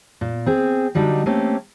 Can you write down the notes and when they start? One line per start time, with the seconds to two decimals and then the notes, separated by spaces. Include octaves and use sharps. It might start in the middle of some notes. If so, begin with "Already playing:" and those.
0.21 A#2
0.46 C4 G#4
0.95 D3 F#3 G3 D#4
1.26 A3 A#3 C4 C#4 G4